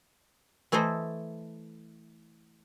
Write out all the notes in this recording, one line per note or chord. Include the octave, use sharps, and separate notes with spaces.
E3 A3 E4 A4 C5 D#5